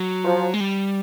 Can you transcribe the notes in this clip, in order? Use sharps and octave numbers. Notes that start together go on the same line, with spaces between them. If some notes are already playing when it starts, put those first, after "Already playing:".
Already playing: F#3
F3
G#3
G3